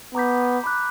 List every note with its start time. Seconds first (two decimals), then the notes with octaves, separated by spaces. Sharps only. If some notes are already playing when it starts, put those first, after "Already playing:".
0.14 B3 A#5 D6 G6 B6
0.64 B5 D6 F#6